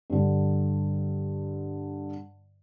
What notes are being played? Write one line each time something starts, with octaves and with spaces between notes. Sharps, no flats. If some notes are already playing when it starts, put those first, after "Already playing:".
G2 D3